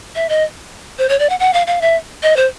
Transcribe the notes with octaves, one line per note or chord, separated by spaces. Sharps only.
E5
D#5
C5
C#5
D5
F#5
F#5
F5
F5
E5
D#5
C5